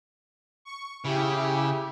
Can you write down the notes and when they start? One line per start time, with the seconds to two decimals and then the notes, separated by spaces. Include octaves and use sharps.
0.65 C#6
1.05 C#3 E4 G4